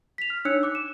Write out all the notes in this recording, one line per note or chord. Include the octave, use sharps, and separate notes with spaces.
B6 F7
F6
D4 D#4 C#5 E6 F#6 C#7
D6 F#6
E7